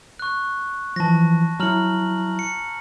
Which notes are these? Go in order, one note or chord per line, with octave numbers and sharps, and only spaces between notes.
C#6 F#6
E3 F3 A5 A#6
F#3 E4 A#5 F6 F#7
C#7